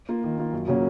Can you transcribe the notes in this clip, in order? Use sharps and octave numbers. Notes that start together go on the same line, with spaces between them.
A#3 F4
D#3
A#3 F4
F#2
C#3 F#3 A#3 C#4